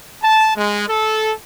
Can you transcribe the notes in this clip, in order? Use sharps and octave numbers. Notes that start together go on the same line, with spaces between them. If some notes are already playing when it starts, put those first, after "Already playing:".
A5
G#3
A4